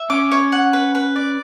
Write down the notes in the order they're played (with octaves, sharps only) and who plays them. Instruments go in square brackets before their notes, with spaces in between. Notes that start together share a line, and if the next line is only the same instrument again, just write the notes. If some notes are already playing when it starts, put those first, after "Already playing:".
Already playing: [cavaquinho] E5
[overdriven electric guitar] C#4 [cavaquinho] D6
[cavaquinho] C#5
F#5
B4
B4
D5